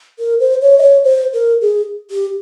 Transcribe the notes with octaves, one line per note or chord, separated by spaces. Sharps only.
A#4
C5
C#5
D#5
C#5
C5
A#4
G#4
G4